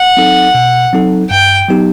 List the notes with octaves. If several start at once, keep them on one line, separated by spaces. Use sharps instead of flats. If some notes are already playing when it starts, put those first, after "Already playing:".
Already playing: F#5
F#3 C4 D#4 A4
B2
F#3 C4 D#4 A4
G2 G5
F#3 B3 D#4 G4